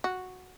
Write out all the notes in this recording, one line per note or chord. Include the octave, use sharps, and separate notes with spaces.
F#4